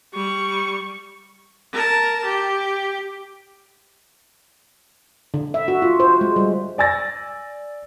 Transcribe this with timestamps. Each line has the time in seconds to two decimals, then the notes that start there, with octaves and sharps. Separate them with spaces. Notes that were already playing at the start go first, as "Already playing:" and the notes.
0.14 G3 C#6
1.72 A#4 A5
2.25 G4
5.34 D3
5.54 E5
5.68 F#4
5.82 F4
6.00 C5
6.21 G#3
6.36 G3
6.78 D5 G#5 E6 A6 A#6